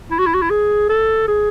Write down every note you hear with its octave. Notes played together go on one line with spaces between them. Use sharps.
E4
F#4
E4
F#4
E4
G#4
A4
G#4